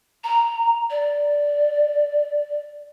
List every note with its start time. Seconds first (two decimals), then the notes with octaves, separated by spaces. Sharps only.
0.24 A#5
0.90 D5